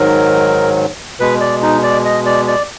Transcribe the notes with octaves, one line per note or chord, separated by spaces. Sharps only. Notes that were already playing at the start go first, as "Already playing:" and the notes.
Already playing: G#2 D#3 F#3 A#4
B2 G#3 B4
D5
D#4
D5
D#5
D5
D5